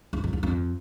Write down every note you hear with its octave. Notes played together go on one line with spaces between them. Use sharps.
E2
F2
E2
F2